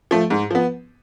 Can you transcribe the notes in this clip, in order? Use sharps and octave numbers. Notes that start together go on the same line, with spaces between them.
F3 A3
G#2
F3 B3